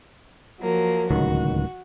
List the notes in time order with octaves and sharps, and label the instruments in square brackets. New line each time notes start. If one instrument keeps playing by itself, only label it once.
[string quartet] F3 F#3 A#3
[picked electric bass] D1 C#2 D#3 [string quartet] F#4